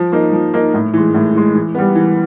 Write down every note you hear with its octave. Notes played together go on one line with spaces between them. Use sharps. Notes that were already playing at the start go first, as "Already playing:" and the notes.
Already playing: F3
A#3 D#4
F3
A#3 D#4
A2
E3 G#3
A2
E3 G#3
E3
G3 B3
E3